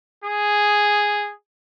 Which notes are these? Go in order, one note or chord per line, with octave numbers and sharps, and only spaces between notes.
G#4